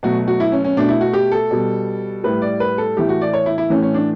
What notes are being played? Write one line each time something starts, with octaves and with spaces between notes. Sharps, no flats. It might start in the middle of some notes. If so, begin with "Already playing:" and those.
B2 F#3 A3 F#4
F#4
E4
C#4
C#4
B2 A3 D4
E4
F#4
G4
A4
B2 G3
A2 G3 B4
D5
B4
A4
A2 E3 A3 G4
F#4
D5
C#5
E4
E4
A2 E3 A3 C#4
C#4
D4